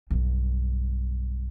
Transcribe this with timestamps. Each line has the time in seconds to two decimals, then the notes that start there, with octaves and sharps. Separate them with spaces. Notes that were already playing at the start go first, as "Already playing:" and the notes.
0.11 B1 G2